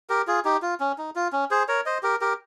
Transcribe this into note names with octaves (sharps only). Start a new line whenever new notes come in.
G4 A#4
F4 G#4
D#4 G4
F4
C#4
D#4
F4
C#4
G#4 C5
A#4 C#5
C5 D#5
G4 A#4
G4 A#4